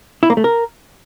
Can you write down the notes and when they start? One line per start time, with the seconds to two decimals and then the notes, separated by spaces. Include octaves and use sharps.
0.23 E4
0.30 A#3
0.37 A3
0.44 A#4